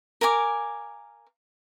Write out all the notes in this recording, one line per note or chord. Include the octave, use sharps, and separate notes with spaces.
A#4 F5 G#5 D6